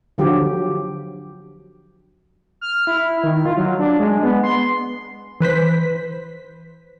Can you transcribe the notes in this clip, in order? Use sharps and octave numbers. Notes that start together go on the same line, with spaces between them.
D3 F3 F#3 G4
F6
E4
D#3
F4
F#3
D4
G#3
B3
C6
E3 B4 C5 B6